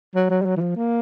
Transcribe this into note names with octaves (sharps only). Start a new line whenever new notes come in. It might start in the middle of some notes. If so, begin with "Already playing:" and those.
F#3
F#3
G3
F#3
E3
F3
A#3